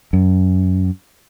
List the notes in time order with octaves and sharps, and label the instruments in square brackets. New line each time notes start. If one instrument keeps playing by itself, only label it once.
[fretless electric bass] F#2